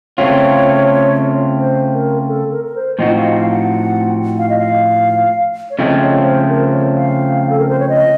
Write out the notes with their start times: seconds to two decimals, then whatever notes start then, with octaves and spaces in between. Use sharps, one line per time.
0.18 C#3 A3 C4 F4 C#5
1.59 C5
1.94 A#4
2.28 A4
2.51 A#4
2.65 A#4
2.76 C5
2.98 A2 F3 C4 D#4 F#4 D#5
3.16 F5
3.33 F5
3.51 F#5
4.39 F5
4.49 D#5
4.59 F5
5.70 C#5
5.79 C#3 F3 A3 C4 D#5
6.02 C#5
6.25 C5
6.49 A#4
6.72 C#5
6.96 F5
7.49 A4
7.59 A#4
7.69 C5
7.79 C#5
7.89 D#5